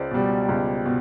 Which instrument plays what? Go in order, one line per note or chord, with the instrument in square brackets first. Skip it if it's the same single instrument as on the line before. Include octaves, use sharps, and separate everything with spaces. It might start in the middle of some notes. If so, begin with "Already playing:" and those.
Already playing: [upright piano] C#2 C5 D5
B2 G3
C#2
B2